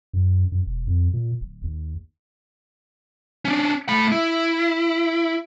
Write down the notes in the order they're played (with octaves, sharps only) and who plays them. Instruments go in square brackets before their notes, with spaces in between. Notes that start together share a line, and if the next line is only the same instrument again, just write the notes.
[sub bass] F#2
F#2
E1
F2
A#2
D1
D#2
[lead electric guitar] C#4 D4
A3 B5
E4